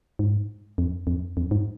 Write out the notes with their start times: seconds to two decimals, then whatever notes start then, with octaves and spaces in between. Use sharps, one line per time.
0.19 G#2
0.78 F2
1.07 F2
1.37 F2
1.51 G#2